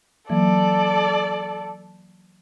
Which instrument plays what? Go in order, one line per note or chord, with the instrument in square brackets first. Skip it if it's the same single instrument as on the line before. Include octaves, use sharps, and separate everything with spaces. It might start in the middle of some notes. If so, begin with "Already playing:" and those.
[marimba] E3 F#3 A#3 [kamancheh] A4 D5